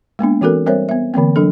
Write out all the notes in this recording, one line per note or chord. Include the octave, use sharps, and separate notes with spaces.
G#3 A#3 B3 D4
E3 C4 F#4 A4 A#4
G3 C4 A#4 C5 C#5 E5
B3 E5
D3 E3 A#3 C4
F#3 D4 A4